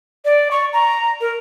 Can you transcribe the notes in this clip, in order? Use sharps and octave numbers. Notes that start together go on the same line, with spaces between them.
D5
C#6
A#5
A#4